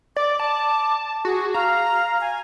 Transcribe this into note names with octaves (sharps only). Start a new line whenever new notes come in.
D5 D6
A5 D6
F#4 G#4
F5 A#5
G#5